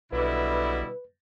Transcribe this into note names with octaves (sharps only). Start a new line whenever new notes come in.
B1 B2 D3 G3 E4 B4